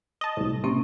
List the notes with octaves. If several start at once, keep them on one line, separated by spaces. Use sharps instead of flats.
D#5 A5
C2 A2
C3 A#3 C4 C#4